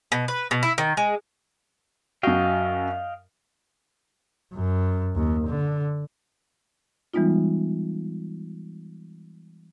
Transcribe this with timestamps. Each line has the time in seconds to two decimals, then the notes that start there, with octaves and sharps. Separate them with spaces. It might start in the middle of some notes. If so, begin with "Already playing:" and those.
0.12 B2
0.28 B4
0.51 B2
0.63 E4
0.78 D#3
0.97 G#3
2.23 F#2 F#4 D#5 F5 G5
4.55 F#2
5.16 D#2
5.47 D3
7.14 E3 G3 G#3 B3 D#4 F4